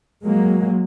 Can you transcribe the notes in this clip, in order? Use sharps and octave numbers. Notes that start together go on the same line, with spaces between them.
F#3 G#3 A#3